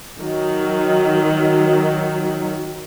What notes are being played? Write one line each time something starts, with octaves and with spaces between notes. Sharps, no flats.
D#3 F#3